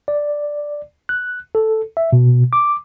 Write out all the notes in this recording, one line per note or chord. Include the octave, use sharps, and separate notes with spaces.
D5
F#6
A4
E5
B2
D6